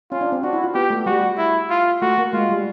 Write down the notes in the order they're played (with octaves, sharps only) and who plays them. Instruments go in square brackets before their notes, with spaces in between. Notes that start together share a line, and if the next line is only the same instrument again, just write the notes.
[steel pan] C#4 [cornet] F4
[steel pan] D4
C4
[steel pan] D4 [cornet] F#4
[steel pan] E4
F4
[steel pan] B3 [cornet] G4
[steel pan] A3
[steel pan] G3 [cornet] F#4
[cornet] E4
F4
[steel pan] A3 [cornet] F#4
[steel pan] A#3
[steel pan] G#3 [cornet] F4
[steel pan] G3